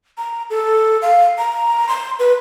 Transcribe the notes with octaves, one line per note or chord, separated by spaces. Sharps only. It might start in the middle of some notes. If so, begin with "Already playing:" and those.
A#5
A4
F5
A#5
C6
B4